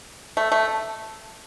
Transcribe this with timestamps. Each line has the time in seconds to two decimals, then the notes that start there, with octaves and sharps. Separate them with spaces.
0.37 A3
0.52 A3